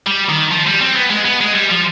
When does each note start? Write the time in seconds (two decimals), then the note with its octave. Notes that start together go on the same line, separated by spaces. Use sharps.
0.07 G3
0.29 D#3
0.51 F3
0.67 G3
0.81 C4
0.96 B3
1.11 G#3
1.25 B3
1.41 G#3
1.55 G3
1.70 F3